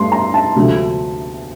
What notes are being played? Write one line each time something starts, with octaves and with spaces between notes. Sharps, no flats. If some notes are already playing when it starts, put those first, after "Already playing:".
Already playing: G2 A3 C6
A#5
A5
D2 C3 F3 A3